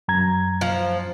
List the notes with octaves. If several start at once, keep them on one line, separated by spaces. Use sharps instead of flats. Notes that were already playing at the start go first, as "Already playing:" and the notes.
F#2 A#5 G#6
F3